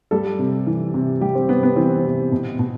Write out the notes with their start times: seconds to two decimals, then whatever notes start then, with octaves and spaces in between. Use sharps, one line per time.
0.11 G3 A4
0.39 C3
0.67 E3
0.94 C3
1.21 G3 G4
1.35 C4
1.49 C3 B3
1.63 B3
1.76 E3 C4
2.04 C3
2.32 B2
2.59 B2